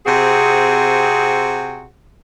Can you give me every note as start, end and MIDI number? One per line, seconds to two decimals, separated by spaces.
0.06 1.87 48
0.06 1.87 60
0.06 1.87 66
0.06 1.87 68